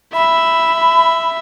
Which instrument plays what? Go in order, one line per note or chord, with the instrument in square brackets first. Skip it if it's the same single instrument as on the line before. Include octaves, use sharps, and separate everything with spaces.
[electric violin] E5 [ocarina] B5